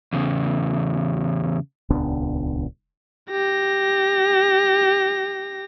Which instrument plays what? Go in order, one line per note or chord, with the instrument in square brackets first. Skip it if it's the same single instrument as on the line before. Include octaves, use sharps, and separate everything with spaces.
[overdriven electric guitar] E2 C#3
[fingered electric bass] D#1 C#2 B3 D4
[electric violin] G4 A#6